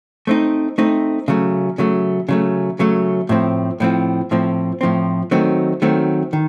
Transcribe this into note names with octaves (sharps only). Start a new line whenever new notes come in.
A3 C4 D#4
A3 C4 D#4
C#3 F#3 A3
C#3 F#3 A3
C#3 F#3 A3
C#3 F#3 A3
A2 F3 C4
A2 F3 C4
A2 F3 C4
A2 F3 C4
D#3 F#3 A3 C4
D#3 F#3 A3 C4
D#3